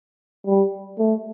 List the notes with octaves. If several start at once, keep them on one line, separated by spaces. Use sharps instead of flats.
G3
A3